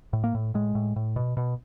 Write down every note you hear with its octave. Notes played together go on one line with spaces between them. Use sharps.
A2
A#3
A2
A2 G#3
A2
A2
B2
B2